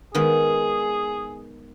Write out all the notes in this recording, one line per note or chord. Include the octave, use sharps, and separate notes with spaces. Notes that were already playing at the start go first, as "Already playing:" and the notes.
D#3 G#3 B3 G#4